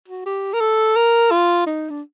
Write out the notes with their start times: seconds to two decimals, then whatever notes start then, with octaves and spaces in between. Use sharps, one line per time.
0.08 F#4
0.26 G4
0.53 A#4
0.60 A4
0.96 A#4
1.31 F4
1.66 D#4
1.90 D4